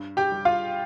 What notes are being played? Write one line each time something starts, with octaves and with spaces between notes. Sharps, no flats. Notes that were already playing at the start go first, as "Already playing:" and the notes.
Already playing: G2
G4 G5
G3
F4 F5